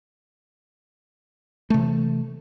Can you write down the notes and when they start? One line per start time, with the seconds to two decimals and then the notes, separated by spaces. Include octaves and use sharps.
1.70 A3
1.74 C3
1.78 E3